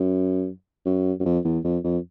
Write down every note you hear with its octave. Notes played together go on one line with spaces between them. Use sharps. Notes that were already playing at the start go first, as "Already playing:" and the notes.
Already playing: F#2
F#2
F#2
F2
E2
F2
F2